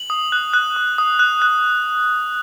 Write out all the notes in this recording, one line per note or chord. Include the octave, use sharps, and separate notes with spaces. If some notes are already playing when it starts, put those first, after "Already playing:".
Already playing: F#7
D#6
F#6
F#6
D#6
D#6
F#6
F#6